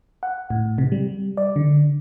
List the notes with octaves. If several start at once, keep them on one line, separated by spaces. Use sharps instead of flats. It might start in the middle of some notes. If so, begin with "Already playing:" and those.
F#5
A2
C3
G3
D5
D3